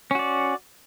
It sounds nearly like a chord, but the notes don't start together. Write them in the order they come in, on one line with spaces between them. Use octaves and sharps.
C#4 F#4 D5